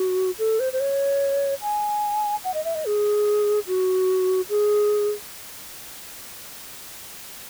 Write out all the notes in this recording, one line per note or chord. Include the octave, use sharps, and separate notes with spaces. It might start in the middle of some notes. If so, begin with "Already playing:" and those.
Already playing: F#4
A4
C5
C5
C#5
G#5
F#5
D#5
E5
D#5
G#4
F#4
G#4